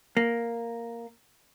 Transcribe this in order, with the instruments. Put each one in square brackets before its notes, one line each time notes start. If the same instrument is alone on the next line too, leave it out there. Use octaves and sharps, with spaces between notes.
[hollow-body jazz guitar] A#3